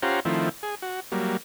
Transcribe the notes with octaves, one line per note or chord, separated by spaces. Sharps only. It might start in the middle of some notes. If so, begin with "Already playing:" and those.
C#4 F4 G4 C5 F#5 A#5
D#3 F3 A3 C4 E4
G#4
F#4
F#3 G3 A#3